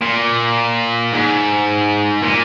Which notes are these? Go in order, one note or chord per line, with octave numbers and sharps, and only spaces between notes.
A#2
G#2
A#2